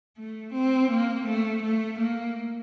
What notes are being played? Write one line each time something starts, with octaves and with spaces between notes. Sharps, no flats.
A3
C4
A#3
A3
A3
A#3